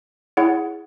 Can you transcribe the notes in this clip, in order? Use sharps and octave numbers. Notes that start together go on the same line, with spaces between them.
E4 G#4 C#5 F#5